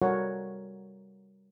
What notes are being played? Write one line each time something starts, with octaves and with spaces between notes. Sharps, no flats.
G3 F#4 A4 A#4 C#5 F#5